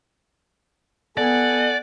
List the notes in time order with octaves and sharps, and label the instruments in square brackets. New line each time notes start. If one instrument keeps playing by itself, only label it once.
[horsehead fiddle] B3 [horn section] A4 F#5 G#5 [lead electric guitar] D5